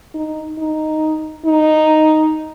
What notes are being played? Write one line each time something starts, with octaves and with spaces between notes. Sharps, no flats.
D#4
D#4
D#4